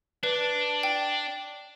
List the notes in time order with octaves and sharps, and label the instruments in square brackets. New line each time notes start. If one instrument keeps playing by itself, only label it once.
[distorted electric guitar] D4 [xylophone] B4
[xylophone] G5